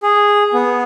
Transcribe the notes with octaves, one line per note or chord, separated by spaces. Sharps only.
G#4
B3